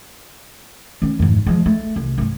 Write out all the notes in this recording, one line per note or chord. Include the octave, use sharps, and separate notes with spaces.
D#3 C#4
G#1 F2
F3 G#3
A3
C2
G2 A3